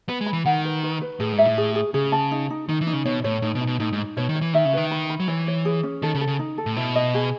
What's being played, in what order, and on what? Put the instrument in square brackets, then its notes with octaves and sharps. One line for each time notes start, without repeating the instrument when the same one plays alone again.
[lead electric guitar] B3 [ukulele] B4
[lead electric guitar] G#3
[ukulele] B5
[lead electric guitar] E3
[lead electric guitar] D#3 [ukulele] F#5
[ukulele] B4
B4
B4
[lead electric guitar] A2 [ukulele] G#4
[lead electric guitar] G#2
[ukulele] E5
[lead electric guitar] A2
[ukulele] G#4
G#4
[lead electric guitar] C#3 [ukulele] G#4
[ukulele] A5
D#4
D#4
[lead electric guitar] D#3 [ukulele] D#4
[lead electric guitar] E3
[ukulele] D#4
[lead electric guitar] C#3
[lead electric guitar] B2 [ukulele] C#5
[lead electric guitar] A2 [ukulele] C#5
[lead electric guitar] A2 [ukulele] D#4
[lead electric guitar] B2
[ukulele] D#4
[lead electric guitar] B2
[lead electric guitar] A2 [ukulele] D#4
[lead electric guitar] G#2
[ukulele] D#4
[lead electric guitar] B2 [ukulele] C#5
[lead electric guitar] D#3
[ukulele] C#5
[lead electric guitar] E3
[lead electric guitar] D#3 [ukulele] E5
[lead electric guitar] C#3
[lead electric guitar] D#3 [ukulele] B4
[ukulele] B5
B5
[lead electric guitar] F#3
[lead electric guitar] E3 [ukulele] C#5
[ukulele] C#5
G#4
C#4
[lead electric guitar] D#3 [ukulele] A4
[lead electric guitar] C#3
[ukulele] A4
[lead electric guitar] C#3
[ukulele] D#4
A4
[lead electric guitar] A2
[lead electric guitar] B2 [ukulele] E4
[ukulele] D#5
G#4